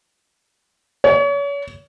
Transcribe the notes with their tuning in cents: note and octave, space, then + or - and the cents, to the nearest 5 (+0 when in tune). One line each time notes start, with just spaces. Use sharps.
C#5 +35